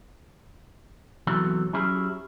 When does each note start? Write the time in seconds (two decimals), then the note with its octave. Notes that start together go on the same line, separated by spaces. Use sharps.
1.27 E2 C3 E3 F#3 A3
1.73 F#3 C#4 E4 G4 G#4